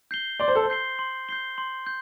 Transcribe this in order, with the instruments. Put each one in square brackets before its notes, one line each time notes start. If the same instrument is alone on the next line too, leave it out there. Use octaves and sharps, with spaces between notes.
[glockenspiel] G6 C7 G7
[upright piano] D5 [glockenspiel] C6
[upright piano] C5
A4
C5
[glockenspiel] G6 C7 G7
C6
G6 C7 G7
C6
G6